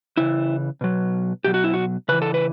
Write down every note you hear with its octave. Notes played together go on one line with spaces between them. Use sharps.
C#3 E3 E4
B2 F#3
B2 F#3 G4
F#4
E4
F#4
C#3 E3 B4
A4
B4